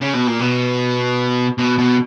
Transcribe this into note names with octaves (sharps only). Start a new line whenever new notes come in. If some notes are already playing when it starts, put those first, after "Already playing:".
C#3
B2
A#2
B2
B2
B2